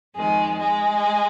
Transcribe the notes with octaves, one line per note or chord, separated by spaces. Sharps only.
F2 D#3 G#3
G#3